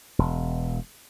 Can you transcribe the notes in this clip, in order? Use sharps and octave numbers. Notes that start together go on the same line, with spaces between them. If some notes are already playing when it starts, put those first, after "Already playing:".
E1